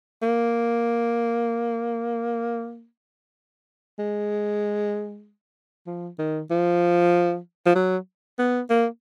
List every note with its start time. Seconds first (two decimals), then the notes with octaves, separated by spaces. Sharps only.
0.22 A#3
3.99 G#3
5.87 F3
6.18 D#3
6.50 F3
7.66 F3
7.75 F#3
8.38 B3
8.70 A#3